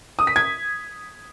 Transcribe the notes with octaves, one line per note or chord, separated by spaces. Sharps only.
D#6
B6
G#6